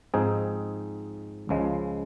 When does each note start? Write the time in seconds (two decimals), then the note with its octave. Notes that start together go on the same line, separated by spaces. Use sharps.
0.14 G#2 F3 C4 D#4 G#4
1.49 C#2 C#3 F3 G#3